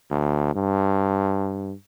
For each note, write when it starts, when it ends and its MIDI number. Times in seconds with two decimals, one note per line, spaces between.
0.10 0.55 38
0.55 1.73 43